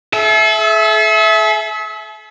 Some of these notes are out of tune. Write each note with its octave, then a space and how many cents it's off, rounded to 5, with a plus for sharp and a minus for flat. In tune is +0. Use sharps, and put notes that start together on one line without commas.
A4 -45 E5 +0